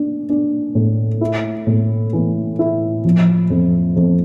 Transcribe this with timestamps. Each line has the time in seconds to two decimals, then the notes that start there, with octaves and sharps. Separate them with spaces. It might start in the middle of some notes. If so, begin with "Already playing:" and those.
Already playing: D4
0.30 D4
0.75 A2
1.21 E4
1.67 A2
2.13 E3
2.59 E4
3.05 F3
3.50 F2
3.96 F2